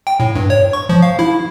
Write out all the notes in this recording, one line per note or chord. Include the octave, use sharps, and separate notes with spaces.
G5
A2
G2
C#5
C#6
F3
F5
E4